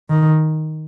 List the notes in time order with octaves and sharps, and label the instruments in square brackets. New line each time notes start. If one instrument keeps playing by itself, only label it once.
[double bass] D#3